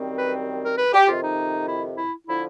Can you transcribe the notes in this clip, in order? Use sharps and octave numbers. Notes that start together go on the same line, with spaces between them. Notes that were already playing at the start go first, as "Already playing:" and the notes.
Already playing: F#2 D#3 G3 C4
B4
A#4
B4
G4
F2 C3 D#3 F4
D#4
E4
E4
D3 F3 E4